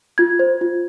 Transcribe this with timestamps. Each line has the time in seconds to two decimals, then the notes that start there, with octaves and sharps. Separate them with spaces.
0.18 F4 G#6
0.39 C5
0.61 F4